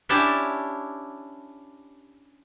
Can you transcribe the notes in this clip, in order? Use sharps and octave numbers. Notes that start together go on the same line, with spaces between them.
C#4 D4 E4 G4 A5